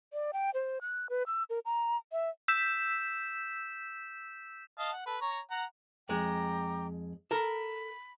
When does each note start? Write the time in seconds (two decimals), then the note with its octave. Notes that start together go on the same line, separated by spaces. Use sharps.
0.13 D5
0.33 G5
0.54 C5
0.81 F#6
1.10 B4
1.27 E6
1.50 A#4
1.65 A#5
2.12 E5
2.48 E6 G6 B6 E7
4.79 D#5 F5 A5
4.93 F#5
5.06 A4 B4
5.22 C#5 A#5
5.51 F#5 A#5
6.09 F2 G#3 G5 A#5 D6
7.31 A4 A#4 B5